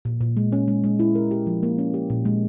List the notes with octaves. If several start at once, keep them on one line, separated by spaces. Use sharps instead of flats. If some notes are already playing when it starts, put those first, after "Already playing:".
A#2
A#2
G#3
C#4
G#3
G#3
E4
A#4
G4
F3
A#3
C#4
G4
A#2
G#3